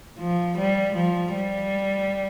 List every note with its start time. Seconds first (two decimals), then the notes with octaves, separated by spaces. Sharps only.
0.20 F3
0.58 G3
0.96 F3
1.34 G3